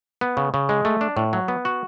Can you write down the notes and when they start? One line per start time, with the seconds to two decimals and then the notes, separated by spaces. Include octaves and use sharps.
0.21 B3
0.37 C#3
0.54 C#3
0.69 G#3
0.85 A3
1.01 D4
1.17 A2
1.33 F#3
1.48 B3
1.65 F#4